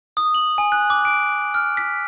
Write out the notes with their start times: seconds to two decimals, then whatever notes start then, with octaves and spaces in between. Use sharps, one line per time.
0.17 D#6
0.34 F#7
0.58 G#5
0.72 F#6
0.90 D6
1.05 D7
1.54 F6
1.77 B6